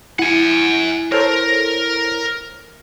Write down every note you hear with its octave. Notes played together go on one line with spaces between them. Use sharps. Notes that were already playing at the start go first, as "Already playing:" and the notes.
E4 F#5 G#5
A4 A#4 C5 C#5